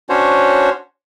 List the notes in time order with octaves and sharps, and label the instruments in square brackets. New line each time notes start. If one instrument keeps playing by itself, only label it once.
[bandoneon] C#4 D4 F#4 C5 C#5